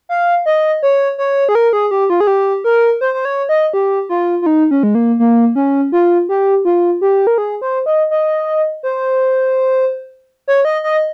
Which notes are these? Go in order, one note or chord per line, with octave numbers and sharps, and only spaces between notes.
F5
D#5
C#5
C#5
G#4
A#4
G#4
G4
F4
G#4
G4
A#4
C5
C5
C#5
D#5
G4
F4
F4
D#4
C#4
G#3
A#3
A#3
C#4
F4
G4
F4
G4
A#4
G#4
C5
D#5
D#5
C5
C#5
D#5
D#5